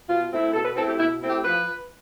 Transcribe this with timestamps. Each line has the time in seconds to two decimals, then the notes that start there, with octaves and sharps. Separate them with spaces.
0.09 B2 F4
0.32 A3 C4 E4
0.54 B2 A4
0.65 B4
0.76 A3 C4 E4 A4
0.88 G4
1.00 B2 E4
1.22 A3 C4 E4
1.30 G4
1.44 F3 B4